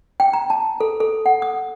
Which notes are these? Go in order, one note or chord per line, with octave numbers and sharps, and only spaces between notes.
G5
A#5
A5
A4
A4
F#5
D#6